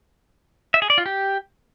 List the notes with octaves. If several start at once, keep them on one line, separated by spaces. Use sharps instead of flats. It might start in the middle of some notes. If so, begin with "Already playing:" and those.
E5
G#4
D5
F4
G4